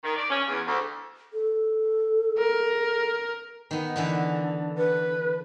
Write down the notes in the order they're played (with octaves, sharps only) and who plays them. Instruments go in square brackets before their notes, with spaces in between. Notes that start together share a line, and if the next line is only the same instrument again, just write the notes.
[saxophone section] D#3
D5
C#4
E2
D2
[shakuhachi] A4
[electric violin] A#4
[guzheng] D#3 B3
D3 E3 B3
[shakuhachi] B4